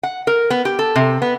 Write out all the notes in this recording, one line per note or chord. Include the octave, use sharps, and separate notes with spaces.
F#5
A#4
B3
G4
A4
C3
B3